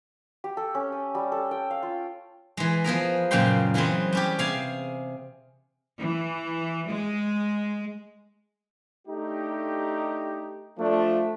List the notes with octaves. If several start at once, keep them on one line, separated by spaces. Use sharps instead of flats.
G4
A4
C#4
D#6
G3
A4
G5
F5
F4
E3 G#3
F3 B3 G#4 A#4
F#2 A#2 C#3 G#3 G5 C6
E3 F#3 G#3 B3 C4
G3 C#4 G4
C3 G#4 F5 G#5
E3
G#3
A3 D4 D#4 G4
F3 A3 D4